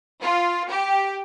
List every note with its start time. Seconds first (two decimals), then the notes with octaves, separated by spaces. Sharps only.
0.20 F4
0.68 G4